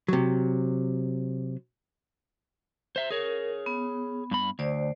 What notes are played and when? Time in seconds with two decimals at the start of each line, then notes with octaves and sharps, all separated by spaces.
0.08 C3 F#3
2.96 C5 E5
3.11 G#4 A#4 C#5
3.66 B3
4.31 G2 B5
4.59 D2 C5 D5